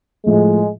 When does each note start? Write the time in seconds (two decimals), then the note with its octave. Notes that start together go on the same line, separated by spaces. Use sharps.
0.25 A2 F3 G#3 A3